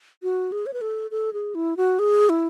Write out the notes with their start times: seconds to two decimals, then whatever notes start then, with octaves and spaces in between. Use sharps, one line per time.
0.23 F#4
0.52 G#4
0.66 C#5
0.73 B4
0.81 A4
1.11 A4
1.33 G#4
1.55 E4
1.77 F#4
1.99 G#4
2.29 E4